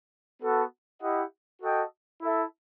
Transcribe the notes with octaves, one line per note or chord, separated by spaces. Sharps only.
B3 F#4 A4
E4 G4 D#5 F#5
F#4 A4 D#5 G5
E4 A4 E5